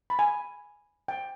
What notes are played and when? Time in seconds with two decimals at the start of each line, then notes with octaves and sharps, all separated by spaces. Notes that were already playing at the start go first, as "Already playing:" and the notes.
0.10 B5
0.19 G#5
1.08 G5